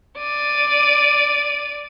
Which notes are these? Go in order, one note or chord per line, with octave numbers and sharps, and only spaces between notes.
D5 D#7